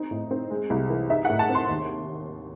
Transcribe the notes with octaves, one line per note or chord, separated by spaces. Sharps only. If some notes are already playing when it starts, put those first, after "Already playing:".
Already playing: C4 D#4
A2
C4
G#3
C2
E3
D#4 E5
A2 F#5
A5
C4
C6
D#2